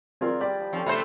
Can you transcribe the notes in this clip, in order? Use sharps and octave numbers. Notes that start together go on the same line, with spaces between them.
C4 F4 G#4 A#4 D5
G3 D5 G5 B5
F3
F3 C4 C#4 A4
C3 A3 A4 C5 E5 B5